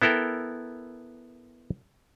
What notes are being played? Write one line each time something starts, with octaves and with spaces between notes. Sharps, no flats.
B3 E4 A4 A#4 G5